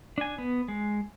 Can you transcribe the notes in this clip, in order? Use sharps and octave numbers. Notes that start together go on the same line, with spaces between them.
D4 G#5
B3
G#3